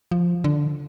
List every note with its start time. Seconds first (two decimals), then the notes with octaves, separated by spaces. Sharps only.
0.11 F3
0.44 D3